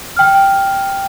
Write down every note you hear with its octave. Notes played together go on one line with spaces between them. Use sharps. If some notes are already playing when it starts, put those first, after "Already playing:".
G5 F6